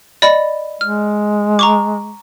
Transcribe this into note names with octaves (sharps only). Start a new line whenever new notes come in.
D5 D#5 B5
G#3 F6
A#5 C#6 D6